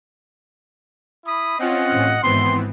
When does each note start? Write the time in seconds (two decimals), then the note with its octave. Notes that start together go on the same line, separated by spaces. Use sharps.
1.26 E4 B5 D#6
1.59 C4 C#4 F4 D#5 F#5
1.91 A1
2.23 G#1 E3 B3 C4 C6